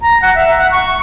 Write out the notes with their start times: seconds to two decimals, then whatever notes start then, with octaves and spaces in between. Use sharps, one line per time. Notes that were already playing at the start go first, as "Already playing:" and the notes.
0.02 A#5
0.22 F#5
0.35 E5
0.58 F#5
0.71 C#6